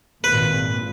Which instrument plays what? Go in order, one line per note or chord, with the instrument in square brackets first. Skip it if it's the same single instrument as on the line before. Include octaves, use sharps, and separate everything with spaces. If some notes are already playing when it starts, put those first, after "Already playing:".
[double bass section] G#1 A#2 [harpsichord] B4